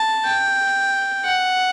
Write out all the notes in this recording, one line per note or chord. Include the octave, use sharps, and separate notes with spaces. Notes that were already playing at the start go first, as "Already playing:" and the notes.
Already playing: A5
G5
F#5